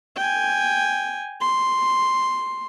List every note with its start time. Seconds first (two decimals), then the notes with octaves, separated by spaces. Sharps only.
0.17 G5 G#5
1.41 C6